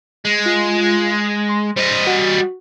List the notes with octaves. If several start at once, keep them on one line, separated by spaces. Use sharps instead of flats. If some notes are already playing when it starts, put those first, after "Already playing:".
G#3
F4
C6
G3 C5 D#5
F#4